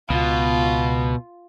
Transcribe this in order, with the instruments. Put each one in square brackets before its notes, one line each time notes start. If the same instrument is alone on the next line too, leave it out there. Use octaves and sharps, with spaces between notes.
[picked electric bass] C#2 [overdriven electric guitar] B2 [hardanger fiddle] F4